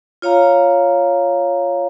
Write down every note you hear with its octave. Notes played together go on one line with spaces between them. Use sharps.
F4 C#5 F5 A#5